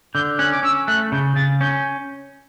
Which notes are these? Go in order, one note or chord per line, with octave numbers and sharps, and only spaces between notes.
D3 G6
C#4 F#6
D6
C#4 E6
A3 F#6
C#3 G6
C#3 A6
C#4 G6